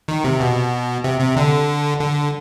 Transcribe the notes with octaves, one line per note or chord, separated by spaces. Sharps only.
D#3
C3
B2
C3
C3
D3
D3